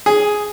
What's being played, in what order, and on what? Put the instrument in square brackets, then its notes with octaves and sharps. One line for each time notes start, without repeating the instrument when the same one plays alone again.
[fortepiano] G#4